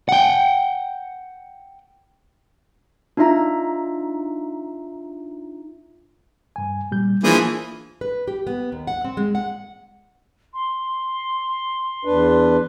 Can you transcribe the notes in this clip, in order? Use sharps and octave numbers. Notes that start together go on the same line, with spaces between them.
F#5 G5
D4 D#4 F4 E5 A#5
G2 G#5
A#2 G3 G6
E3 F3 A#3 D4 G#4
B4
G4
B3
D#2
F#5
C4
G#3
F#5
C6
E2 D4 B4